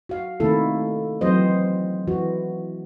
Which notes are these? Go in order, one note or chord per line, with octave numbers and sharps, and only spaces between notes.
F#4 F5
C3 D#3 A3 A#3 E4 A4
E3 F#3 C4 C5 D#5
E3 F#4